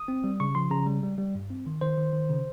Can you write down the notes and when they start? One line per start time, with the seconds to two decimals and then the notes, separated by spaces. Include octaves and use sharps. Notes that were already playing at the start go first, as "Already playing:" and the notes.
Already playing: D#6
0.08 C4
0.24 G3
0.40 C#3 C#6
0.55 F3 C6
0.71 C#3 A#5
0.86 G3
1.03 G3
1.18 G3
1.35 G2
1.50 C4
1.66 D#3
1.81 D#3 C5
1.97 D#3
2.13 D#3
2.30 C#3